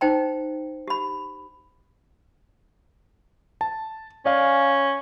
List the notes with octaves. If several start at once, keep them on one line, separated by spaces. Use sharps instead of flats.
D#4 C5 G5 A#5
G4 B5
A5
C#4 D5 F5 G#5